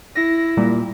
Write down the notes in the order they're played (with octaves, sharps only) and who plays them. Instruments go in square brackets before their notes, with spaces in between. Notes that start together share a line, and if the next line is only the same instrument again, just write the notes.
[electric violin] E4 [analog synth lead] A#6
[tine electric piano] A#2 [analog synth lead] G3